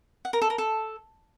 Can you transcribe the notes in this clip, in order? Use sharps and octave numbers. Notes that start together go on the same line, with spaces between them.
F#5
A#4
A4
A#4
A4